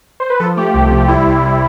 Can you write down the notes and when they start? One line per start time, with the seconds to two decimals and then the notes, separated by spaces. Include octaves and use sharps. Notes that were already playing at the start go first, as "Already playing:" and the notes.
0.20 C5
0.30 B4
0.40 F3 A4
0.57 A3 G4
0.74 C2 G4
0.91 C3
1.08 G3 E4
1.26 C2
1.43 C2